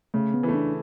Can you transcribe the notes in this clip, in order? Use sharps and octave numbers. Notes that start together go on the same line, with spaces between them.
C#3 A3
B3
E3 A3
D4